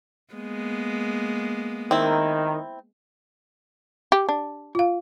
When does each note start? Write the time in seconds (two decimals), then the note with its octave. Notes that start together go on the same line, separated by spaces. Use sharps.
0.34 G#3 A#3 B3
1.91 D#3 C4 E4
4.12 G4
4.29 D4
4.75 F4 F5